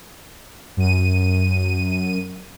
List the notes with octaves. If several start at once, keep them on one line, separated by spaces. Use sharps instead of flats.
F#2 D#7